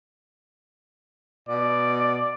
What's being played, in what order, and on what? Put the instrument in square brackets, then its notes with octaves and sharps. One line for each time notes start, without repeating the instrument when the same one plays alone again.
[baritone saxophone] B2 [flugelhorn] D5